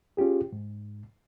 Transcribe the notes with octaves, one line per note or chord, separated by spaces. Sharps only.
C#4 F4 G4 G#4
G#2